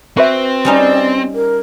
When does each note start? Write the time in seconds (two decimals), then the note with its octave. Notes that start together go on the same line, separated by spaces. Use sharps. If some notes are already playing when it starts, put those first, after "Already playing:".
0.17 C4 F#4 B4 E5
0.65 G3 C#4 D#4 D5
1.34 A#4